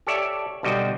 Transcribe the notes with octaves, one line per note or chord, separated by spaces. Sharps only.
G4 A4 C#5 D5 E5
B1 D3 G3 F#4 D#5 G5